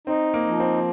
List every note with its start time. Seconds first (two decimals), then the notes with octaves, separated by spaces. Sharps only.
0.07 C4 D#4
0.34 A#3
0.47 F3
0.60 C4